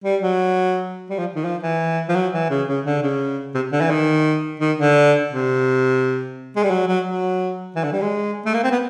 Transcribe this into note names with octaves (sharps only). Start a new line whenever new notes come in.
G3
F#3
G3
F3
D#3
F3
E3
F3
F#3
E3
C#3
C#3
D3
C#3
C3
D3
E3
D#3
D#3
D3
C3
G#3
G3
F#3
F#3
F#3
E3
D3
G3
G#3
A3
A#3
C4
B3